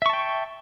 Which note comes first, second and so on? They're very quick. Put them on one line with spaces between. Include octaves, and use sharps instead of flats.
E5 C#6 A5 G5